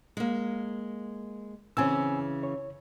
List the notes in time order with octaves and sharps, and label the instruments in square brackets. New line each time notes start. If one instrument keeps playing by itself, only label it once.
[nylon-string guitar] G#3 A#3
[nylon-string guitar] C#3 E3 [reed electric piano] C4 G#5 E6
[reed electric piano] C#5